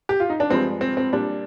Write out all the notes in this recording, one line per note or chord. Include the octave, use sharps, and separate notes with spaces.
G4
F4
D#4
D4
G2 F3 G#3 C4
C4
C4
A#2 G3 D4